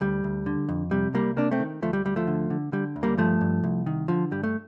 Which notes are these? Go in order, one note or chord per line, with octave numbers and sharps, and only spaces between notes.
D2 G3
D2
D3
F2
C3 G3
C2 G3 A#3
C3 A#3 D4
A3 C4
D#3
D2 F3 A3
G3
D2 G3
F3 A3
D3
D3
D3 G3
D2
G3 A#3
G2 F3 A3
G2
C2
D#3
D3 F3
G2 G3
A3